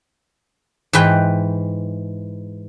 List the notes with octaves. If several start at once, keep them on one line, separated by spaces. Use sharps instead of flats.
G#2 E3 B4 G5